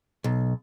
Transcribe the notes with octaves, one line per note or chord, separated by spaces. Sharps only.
B1